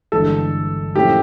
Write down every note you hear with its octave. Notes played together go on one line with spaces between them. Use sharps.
G1 G2 E3 G#3 A4
A#2 F3 A3 C#4 E4 G4